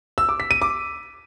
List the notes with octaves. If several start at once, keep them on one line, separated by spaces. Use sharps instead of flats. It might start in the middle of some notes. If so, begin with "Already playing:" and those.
E6
D6
B6
D#7
D6